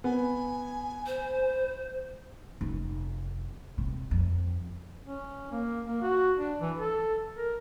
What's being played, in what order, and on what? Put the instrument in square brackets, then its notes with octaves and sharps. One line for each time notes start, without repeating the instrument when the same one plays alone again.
[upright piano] B3 [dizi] G#5
[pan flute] C5
[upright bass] F1
C3
F2
[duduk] C#4
A#3
A#3
F#4
D4
E3
A4
A#4